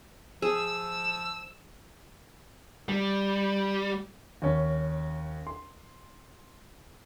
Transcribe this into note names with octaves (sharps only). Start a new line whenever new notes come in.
F3 G#4 E6
G3
D#2 C#4
C6